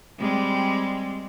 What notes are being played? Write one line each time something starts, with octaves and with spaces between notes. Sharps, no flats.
G3 G#3 C4